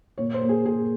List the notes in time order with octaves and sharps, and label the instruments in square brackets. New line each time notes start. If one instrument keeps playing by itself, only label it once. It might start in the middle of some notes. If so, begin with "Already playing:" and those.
[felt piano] A#2 C#5
C5
A#3
G#4
A#2 G#4